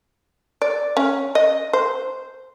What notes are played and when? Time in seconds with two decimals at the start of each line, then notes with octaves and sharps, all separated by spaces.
0.62 D5
0.97 C#4
1.35 D#5
1.73 C5